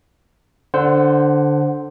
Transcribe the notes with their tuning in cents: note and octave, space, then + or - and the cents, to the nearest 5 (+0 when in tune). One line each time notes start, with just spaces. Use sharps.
D3 +0 C5 +0 F#5 +15